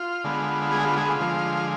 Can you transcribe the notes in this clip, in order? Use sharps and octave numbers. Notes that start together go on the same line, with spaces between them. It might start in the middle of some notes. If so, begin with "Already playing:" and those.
Already playing: F4
D3 G#3 B3
G#3 G#4
F4
G#3 G#4
F4
D3 F3 G#3